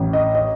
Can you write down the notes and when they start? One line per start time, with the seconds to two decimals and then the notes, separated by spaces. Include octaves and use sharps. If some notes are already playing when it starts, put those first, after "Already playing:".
Already playing: A1
0.13 D#5
0.35 D#5